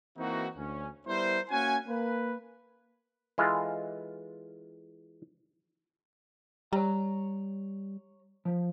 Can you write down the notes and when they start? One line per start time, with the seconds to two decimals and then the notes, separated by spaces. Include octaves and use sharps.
0.17 E3 A#3 C4 D#4 E4 F#4
0.56 D2 C#4
1.06 G3 B3 E4 A#4 C5
1.50 A#3 C#4 F#4 F#5 G#5
1.88 A#3 B4
3.38 E3 G#3 F4 A4
6.73 G3 C#5 A#5
8.45 F3